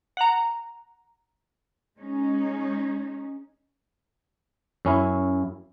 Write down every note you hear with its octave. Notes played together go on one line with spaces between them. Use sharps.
F#5 A#5
G#3 C#4 D#4
F#2 C#4 E4